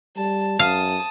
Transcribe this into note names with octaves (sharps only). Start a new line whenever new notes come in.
G3 A5
F#2 F5 A5 D#6